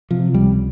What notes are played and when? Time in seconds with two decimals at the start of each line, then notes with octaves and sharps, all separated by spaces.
0.11 C3 F3
0.34 C#2 G3